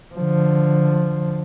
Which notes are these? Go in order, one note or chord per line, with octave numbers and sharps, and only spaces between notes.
D3 F3